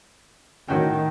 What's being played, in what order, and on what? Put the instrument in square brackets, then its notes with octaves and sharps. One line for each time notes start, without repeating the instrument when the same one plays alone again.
[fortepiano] A2 F#4 G5 [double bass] D#3